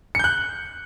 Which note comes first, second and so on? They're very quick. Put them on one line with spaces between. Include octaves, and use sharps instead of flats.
C#7 G6 F#6